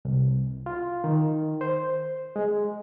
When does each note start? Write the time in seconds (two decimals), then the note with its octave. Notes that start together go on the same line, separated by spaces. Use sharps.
0.05 C2
0.66 F4
1.04 D#3
1.61 C5
2.36 G#3